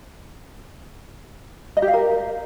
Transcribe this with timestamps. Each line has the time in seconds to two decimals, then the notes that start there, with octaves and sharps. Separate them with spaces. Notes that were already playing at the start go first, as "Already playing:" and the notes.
1.77 D#5
1.82 G4
1.88 F5
1.93 A#4